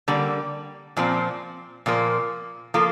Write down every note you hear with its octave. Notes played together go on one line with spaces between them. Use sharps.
D3 G3 A#3
A#2 F3 C4
A#2 F3 A#3
F3 A#3 F4 A4